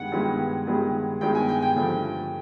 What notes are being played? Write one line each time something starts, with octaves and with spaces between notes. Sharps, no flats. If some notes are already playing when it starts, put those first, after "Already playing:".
Already playing: G2 D#3 G#3 B3 F#5
G2 D#3 G#3 B3
G2 D#3 G#3 B3
G2 D#3 G#3 B3 G5
G#5
G5
G5
G2 D3 F3 A3